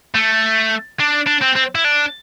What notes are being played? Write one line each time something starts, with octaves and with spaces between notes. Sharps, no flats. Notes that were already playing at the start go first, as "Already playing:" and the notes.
A3
D4
D4
C4
C4
E4
D4